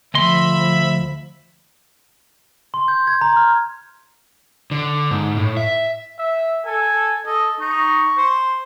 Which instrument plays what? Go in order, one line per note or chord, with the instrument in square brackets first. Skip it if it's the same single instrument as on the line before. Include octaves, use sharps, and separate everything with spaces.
[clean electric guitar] D2 D#5 C6 [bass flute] F3 [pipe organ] E5 B5
[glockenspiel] C6
G6
G#6
A#5
F6
[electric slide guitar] D3
G#2
A2
E5
[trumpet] E5
[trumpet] A4 [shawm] G#5
[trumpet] A4 [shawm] D#5
[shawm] D#4 [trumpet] C#6
[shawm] C5